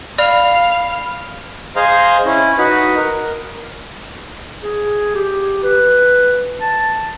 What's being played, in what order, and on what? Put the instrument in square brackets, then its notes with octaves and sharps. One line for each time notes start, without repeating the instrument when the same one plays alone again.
[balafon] D5 [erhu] F5 [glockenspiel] B5 F6 F7
[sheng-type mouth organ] G#4 C5 D#5 F5 A#5
C#4 E4
D#4 F#4 B4
A#4
[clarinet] G#4
G4
B4
A5